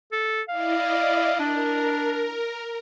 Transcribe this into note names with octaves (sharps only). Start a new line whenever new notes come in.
A4
E4 D5 D#5 F5
D4 A#4